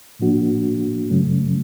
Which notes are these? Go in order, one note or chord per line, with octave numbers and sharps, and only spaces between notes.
A2 F3 A#3 D4 F#4
F#2 C#3 F#3 A3 C#4